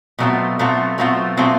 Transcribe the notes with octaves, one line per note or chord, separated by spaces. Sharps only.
B2 F#3 A3 C4 F4
B2 F#3 A3 C4 F4
B2 F#3 A3 C4 F4
B2 F#3 A3 C4 F4